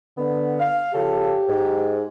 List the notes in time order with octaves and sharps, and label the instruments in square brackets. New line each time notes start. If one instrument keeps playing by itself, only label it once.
[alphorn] D3 [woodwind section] B3
[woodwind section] F5
[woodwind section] C#3 F3 A4 [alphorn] G4
[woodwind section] G#2